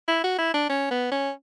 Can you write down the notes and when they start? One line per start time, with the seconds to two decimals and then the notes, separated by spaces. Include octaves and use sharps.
0.08 E4
0.24 F#4
0.38 E4
0.54 D4
0.69 C#4
0.91 B3
1.12 C#4